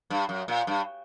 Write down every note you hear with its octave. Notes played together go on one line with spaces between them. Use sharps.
G2
F#2
A#2
G2